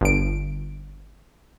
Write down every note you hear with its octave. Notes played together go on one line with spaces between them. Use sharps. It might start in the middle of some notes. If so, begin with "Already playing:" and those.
G1 D7